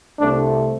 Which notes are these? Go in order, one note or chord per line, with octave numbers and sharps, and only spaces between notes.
C2 C3 A3 D4